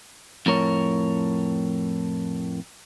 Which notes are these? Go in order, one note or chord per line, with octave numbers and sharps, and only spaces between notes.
F2 A2 A#4 C#5